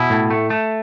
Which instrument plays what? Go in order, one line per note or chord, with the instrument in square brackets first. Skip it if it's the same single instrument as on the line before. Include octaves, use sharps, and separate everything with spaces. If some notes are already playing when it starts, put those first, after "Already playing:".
Already playing: [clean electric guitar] B2 [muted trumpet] E4
[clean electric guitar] A2
A3
A3